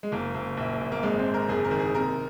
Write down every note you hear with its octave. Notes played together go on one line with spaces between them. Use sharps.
G#3
F#1 A#3
F#1
A#1
A#1
A#3
G#1 G#3
C4
G#1
A#4
F#1 G#4
A#4
D#3
G#4
C3 A#4